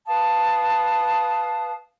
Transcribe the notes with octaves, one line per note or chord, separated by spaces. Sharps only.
B4 F5 A5 D#6